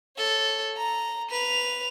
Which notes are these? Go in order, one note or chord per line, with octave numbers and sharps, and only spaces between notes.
A4 C#5
A#5
B4 F7